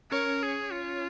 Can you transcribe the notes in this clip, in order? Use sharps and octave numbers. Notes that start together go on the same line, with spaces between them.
C#4 A#4 C#5
G#4
F4